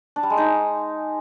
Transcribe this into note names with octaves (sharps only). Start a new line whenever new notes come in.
D4
G3
G#3
D#4